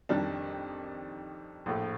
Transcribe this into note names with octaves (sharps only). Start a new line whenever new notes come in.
F2 D#3 G3 D4
A#1 A2 A3